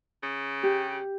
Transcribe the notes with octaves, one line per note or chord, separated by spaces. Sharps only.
C#3
G4